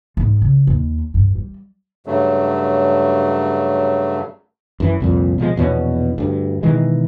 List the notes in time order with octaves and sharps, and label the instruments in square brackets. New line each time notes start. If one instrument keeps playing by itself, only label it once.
[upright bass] G#2
C#3
D#2
G2
G3
[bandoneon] G2 C#3 F#3 A3
[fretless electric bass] F#2 E3
C2 F2 A#2
B2 F3 F#3 G#3
A#1 E2 B2 C#4
D2 G2
B2 D#3 E3 G#3